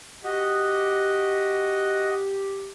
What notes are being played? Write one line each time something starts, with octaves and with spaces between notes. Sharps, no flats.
F#4 G4 D#5